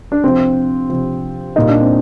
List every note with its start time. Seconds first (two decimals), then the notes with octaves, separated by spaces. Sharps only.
0.12 D4
0.24 C3 F3 C4
0.90 C3 F3
1.56 A#2 G3 D#4
1.69 D4
1.81 C4